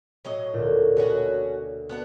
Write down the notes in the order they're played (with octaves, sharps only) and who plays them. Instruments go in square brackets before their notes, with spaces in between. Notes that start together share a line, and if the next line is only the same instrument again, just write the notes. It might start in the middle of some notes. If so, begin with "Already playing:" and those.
[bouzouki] A2 F#3 D#5
[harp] D2 A#2
[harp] B2 [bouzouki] F#3 C#4 F#4
[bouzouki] B3 D4 F#4 [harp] F#6